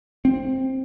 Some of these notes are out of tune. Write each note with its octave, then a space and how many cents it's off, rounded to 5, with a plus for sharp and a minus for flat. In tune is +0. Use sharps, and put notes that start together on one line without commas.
C4 +10